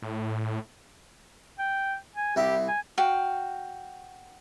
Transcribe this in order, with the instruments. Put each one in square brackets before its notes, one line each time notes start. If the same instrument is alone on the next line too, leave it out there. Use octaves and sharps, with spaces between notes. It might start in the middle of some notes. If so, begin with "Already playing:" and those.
[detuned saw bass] A2
[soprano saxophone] G5
G#5
[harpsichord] C2 E4 [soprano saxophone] G4
[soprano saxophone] G#5
[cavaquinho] F#4 F5 G5